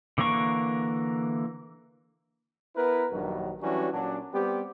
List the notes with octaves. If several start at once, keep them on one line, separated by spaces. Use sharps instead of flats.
D3 E3 A#3 A#4 C#6
B3 E4 A#4 B4
A#1 G2 D#3 F#3
E3 F#3 G3 C#4 D4 F#4
A#2 F#3 C#4 D4
G3 B3 C4 G4